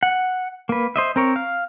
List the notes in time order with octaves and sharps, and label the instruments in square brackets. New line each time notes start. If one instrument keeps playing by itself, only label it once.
[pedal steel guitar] F#5
A#3 B4
C5 D#5 E5
C4 A#4 C#5
F5